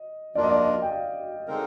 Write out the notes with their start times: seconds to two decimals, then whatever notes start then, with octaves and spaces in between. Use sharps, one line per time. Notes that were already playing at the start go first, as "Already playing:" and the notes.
Already playing: D#5
0.35 F3 A#3 D4 F4 A#4 D5
0.43 D#5
0.50 D5
0.64 D#5
0.82 G5
0.91 F5
1.47 D3 G#3 C4 D#4 A#4